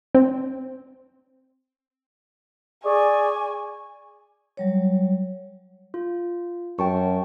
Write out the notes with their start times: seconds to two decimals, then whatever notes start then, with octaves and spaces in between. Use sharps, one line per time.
0.15 C4
2.85 G#4 D5 G#5 C#6
4.57 F#3 G3 C#5
5.94 F4
6.79 F#2 G5 A5 C#6